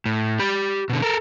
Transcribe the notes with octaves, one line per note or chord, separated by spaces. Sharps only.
A2
G4 B5
B2 D3
A4 A#4